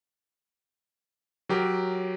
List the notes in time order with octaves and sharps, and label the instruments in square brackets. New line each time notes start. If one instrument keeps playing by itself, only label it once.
[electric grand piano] F#3 G4 A#4